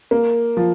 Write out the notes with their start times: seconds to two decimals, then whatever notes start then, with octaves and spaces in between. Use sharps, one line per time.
0.11 A#3
0.57 F3